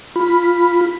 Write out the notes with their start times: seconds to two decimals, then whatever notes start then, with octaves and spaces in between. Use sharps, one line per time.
0.16 F4 B5